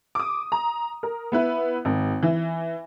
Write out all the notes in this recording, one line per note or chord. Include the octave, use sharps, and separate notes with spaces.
D6 D#6
A#5
A#4
B3 E4 B4
G#1
E3